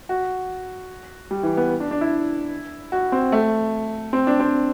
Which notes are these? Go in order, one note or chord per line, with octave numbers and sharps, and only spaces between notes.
F#4
G3
E3
B3
D4
D4
E4
F#4
C4
A3
C4
D4
C4